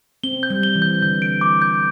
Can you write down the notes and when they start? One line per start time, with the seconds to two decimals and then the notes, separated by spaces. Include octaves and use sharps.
0.24 C4 G7
0.43 G6
0.50 G3
0.63 G7
0.75 E3
0.82 G6
1.02 D3 G6
1.22 D7
1.41 D6
1.62 G6